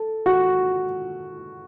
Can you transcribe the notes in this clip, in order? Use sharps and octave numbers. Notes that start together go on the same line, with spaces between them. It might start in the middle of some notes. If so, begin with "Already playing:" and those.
Already playing: A4
F#4